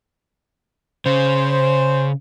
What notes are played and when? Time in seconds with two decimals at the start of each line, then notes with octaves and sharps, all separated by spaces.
1.06 C#3 C5